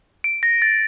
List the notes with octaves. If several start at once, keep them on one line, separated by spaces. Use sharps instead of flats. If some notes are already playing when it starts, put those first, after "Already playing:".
D7
A#6
A6